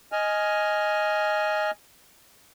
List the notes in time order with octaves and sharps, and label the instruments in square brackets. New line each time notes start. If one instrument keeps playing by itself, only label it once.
[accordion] D#5 G#5 F6